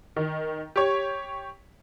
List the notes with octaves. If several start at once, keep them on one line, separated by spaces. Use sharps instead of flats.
D#3
G4 C#5